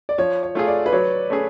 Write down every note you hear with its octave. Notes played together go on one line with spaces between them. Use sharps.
D5
F3 C#5
C#5
A3 F4 G#4
D5
B4
F#3 C#5
A3 C#4 G#4